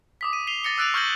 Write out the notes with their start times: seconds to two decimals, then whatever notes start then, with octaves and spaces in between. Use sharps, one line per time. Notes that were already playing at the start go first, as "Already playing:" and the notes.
0.21 D6 D#6 B6
0.33 D#7
0.47 C7 D#7 F7 G7
0.64 D#6 A6 A#6 C#7 G7
0.78 E6 F#6 A6 D7 D#7 F7
0.94 C#6 F6 G6 G#6 A#6 F#7